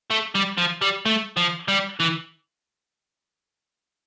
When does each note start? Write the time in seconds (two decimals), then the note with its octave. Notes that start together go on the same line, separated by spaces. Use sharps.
0.11 A3
0.35 G3
0.58 F3
0.81 G3
1.06 A3
1.37 F3
1.68 G3
2.00 E3